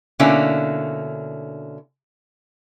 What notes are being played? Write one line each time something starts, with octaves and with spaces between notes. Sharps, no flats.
B2 D3 A#3 C#4 E4